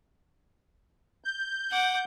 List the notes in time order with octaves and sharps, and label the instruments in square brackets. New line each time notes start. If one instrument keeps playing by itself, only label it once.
[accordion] G6
[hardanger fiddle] F#5 D6